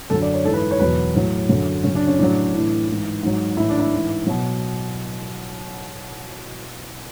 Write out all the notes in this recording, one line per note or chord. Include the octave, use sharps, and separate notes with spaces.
F#2 D3 F#3 A4
D5
C#5
G#2 E3 A4
B4
C#5
E2 B2 F#3 B4
A2 F#3
F#2 D3 F#3
F#2 C#3 F#3 C#4
D4
C#4
A2 F#3 D4
A2 E3
G#2 E3
G#2 F#3
A2 E3 E4
D4
E4
G#2 E3
B2 F#3